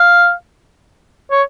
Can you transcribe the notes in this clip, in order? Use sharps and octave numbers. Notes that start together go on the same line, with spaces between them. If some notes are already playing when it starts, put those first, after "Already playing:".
Already playing: F5
C#5